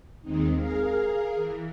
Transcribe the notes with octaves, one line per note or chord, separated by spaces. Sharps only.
D#2 D#3 G#3 C4 D#4
G#4 A#4 F5
E3